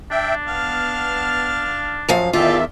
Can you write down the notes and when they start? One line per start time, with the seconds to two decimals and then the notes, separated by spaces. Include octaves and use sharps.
0.11 D4 E5 G5
0.48 B3 F5 A5 F6
2.09 F#2 F3 F5
2.33 E2 D#3 F4 G#4 A4 D5 E5 G5